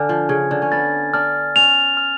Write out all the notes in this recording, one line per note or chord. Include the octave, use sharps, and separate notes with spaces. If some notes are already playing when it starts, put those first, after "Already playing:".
Already playing: D3 G#5 F6
F3
C#3 G#6
D3
C#4
B3 A6
D4 F6
C#4 F7
F6